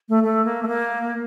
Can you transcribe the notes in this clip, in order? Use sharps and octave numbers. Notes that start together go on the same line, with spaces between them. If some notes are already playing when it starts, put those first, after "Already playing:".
A3
A3
A#3
A3
A#3